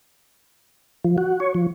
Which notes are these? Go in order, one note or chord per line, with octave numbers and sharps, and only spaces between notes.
F3
F#4
C#5
F3